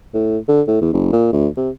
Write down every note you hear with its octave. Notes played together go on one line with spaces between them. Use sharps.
A2
D3
A2
E2
F#1
A#2
D2
C3